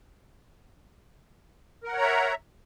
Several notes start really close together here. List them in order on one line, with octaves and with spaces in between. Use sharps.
A#4 F#5 C#5 A#5 E5